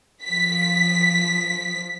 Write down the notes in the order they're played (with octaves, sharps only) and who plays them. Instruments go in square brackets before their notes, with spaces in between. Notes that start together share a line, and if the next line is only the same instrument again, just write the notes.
[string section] F3 B6